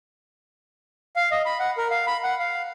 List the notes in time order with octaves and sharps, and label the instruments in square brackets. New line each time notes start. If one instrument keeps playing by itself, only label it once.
[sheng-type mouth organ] F5
D#5
B5
F#5
A#4
F5
B5
F#5
F5